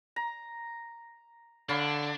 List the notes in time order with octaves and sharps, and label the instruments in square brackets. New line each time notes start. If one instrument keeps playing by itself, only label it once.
[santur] A#5
[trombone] D3 [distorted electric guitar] D4 [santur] C#5 F5 B5